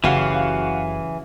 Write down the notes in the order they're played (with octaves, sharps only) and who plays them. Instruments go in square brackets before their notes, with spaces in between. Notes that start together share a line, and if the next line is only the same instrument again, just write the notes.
[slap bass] F#1 [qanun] C#3 G4 C6 [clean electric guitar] E3 [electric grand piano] F#4 F5 F#5